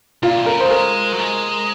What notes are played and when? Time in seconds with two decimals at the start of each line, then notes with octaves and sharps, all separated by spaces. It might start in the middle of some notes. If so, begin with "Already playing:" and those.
0.23 A#2 F4
0.37 C3
0.46 C#3 A#4
0.60 F#3 C5
0.71 G#3 A#4
1.13 F#3
1.19 G#3